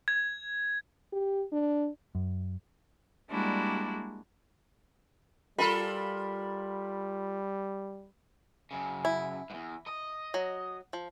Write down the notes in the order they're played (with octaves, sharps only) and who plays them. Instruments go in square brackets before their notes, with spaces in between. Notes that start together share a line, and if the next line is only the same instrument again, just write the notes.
[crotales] G#6
[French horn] G4
D4
[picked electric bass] F#2
[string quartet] G3 G#3 A#3 D4 E4 F#4
[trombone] G3 [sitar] F4 A4 A#4 [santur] B5
[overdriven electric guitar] F#2 C#3
[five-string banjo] E4
[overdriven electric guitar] E2 G#2
D#5
[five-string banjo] F#3
F3